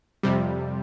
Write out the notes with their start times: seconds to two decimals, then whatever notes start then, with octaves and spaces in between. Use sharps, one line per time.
0.23 F2 C3 G3